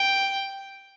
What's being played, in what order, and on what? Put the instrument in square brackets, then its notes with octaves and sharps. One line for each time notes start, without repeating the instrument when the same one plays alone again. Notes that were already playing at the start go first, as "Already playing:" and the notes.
Already playing: [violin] G5